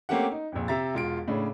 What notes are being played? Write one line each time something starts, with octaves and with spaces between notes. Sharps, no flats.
A3 A#3 C4 C#4 G4 F#5
D#4
A#1 F2
C3 E5 A#5 A6
E1 F4 D7
A2 C#3 D4